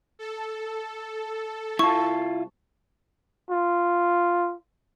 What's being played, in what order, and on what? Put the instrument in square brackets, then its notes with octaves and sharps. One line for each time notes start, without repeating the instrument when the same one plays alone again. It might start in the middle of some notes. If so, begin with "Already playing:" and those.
[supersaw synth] A4
[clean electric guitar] C2 A5 [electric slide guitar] E4 F4 [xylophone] C#6
[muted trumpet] F4